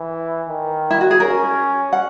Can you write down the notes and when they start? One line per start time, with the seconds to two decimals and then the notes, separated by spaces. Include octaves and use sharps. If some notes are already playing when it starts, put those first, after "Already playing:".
Already playing: E3
0.49 D#3
0.91 E4
1.01 F#4
1.11 G#4
1.20 C#4 A#4
1.93 F#5